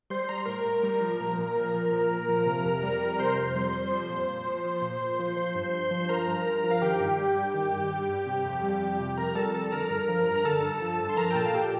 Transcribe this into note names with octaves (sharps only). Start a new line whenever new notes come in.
G3 C5 C6
G3 A#5
C6
A2 A#4 A#5
A2
G3
F3
A#2
A#2
F3
F3
A#2
A#2
F3
C3
F2
G3
F2
C3 C5 C6
F2
G3
F2
F3
A#2
A#2
F3
F3
A#2
A#2
F3
F3 C5 C6
G2
G2
F3
F3 A#4 A#5
G2
G2
F3
F5
D#3 G4 G5
G2
G3
G2
D#3
G2
G3
G2
C3
F2
G3
F2
C3
F2 A#4 A#5
G3 A4 A5
F2 A4 A5
D3 A#4 A#5
G2
F3
G2
A#5
D3 A4 A5
G2
F3
G2
C6
F3 A#4 A#5
G5
A#2 A4 A5
F5
A#2 G4 G5